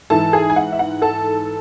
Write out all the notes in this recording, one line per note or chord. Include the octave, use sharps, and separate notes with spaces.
G#2 E3 A4 A5
G#4 G#5
G#5
F#5
E5
F#5
A4 A5